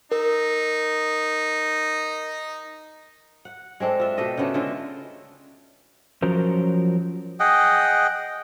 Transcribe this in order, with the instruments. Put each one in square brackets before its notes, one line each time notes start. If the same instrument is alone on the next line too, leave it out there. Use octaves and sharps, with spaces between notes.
[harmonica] D#4 [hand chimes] A#4
[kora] F#5
G#3 C4 D4 A4
F4 E5
B2 G4 A4 D#5
C#3 A3 B3 D4
D3 G#3 F4 E5
[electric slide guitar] F3 F#3 C#4 A#4 C5
[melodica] G#4 D#5 F#5 G5